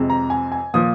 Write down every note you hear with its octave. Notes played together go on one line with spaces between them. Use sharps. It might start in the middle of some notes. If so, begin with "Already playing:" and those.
Already playing: F2 C3 G#3 C4
A#5
G#5
G#5
A#2 F3 D#6